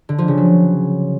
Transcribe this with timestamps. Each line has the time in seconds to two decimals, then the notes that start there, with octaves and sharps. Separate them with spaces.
0.09 D3
0.18 F3
0.28 C#3
0.38 F#3